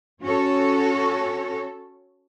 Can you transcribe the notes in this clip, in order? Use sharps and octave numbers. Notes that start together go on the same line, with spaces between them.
C#4 F#4 A4 C#5